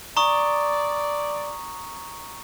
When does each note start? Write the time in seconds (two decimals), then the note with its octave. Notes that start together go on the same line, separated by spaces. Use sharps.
0.17 D5 A#5 C#6 D#6